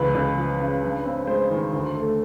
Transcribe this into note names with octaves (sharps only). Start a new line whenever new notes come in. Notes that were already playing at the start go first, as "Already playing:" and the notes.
Already playing: C#2 E3 B4
C#2
F3
C#3
G2
C4
G#3 C5
D#3
D2
A3